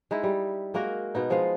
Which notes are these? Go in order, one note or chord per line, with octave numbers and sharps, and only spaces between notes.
G#3 D#4 E4
G3
G#3 A#3 F#4 A#4
B2 B3 D#4
F3 G#3 F4 F5